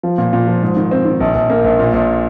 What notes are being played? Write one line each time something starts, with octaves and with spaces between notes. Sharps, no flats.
F3
A#2
A#2
F3
G#2
D#3
C4
D#3
A#1
A#1
A#3
A#1
A#2
A#1